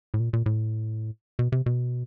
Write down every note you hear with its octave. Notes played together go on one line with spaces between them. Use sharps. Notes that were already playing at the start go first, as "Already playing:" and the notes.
A2
A#2
A#2
A2
B2
C3
B2